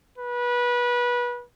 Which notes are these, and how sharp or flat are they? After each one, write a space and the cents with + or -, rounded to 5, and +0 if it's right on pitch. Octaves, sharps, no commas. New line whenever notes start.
B4 -25